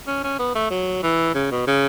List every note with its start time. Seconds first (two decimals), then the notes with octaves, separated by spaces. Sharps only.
0.07 C#4
0.24 C#4
0.39 B3
0.55 A3
0.71 F#3
1.03 E3
1.35 C#3
1.52 B2
1.67 C#3